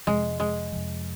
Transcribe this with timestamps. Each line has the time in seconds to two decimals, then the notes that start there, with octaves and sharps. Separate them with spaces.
0.07 F2 C3 F3 G#3
0.40 G#3
0.72 F2 C3 F3